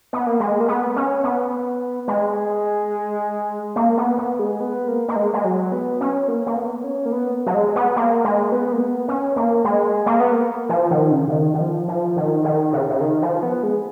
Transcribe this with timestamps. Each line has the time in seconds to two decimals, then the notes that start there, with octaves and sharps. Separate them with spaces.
0.13 B3
0.26 A#3
0.40 G#3
0.60 A#3
0.68 B3
0.96 C#4
1.24 B3
2.08 G#3
3.76 A#3
3.98 B3
4.18 B3
4.39 G#3
4.60 B3
4.88 A#3
5.08 A#3
5.16 G#3
5.34 G#3
5.44 F#3
5.72 B3
6.01 C#4
6.28 A#3
6.46 A#3
6.56 B3
6.84 C#4
7.06 A#3
7.12 B3
7.46 F#3
7.54 G#3
7.76 B3
7.96 A#3
8.24 G#3
8.52 B3
8.72 A#3
8.80 B3
9.08 C#4
9.36 A#3
9.64 G#3
10.06 A#3
10.20 B3
10.33 A#3
10.69 F3
10.91 D#3
11.11 C#3
11.28 C#3
11.33 D#3
11.54 D#3
11.61 F3
11.88 F3
12.17 D#3
12.44 D#3
12.73 C#3
12.90 C#3
13.01 D#3
13.22 F3
13.43 B3
13.63 G#3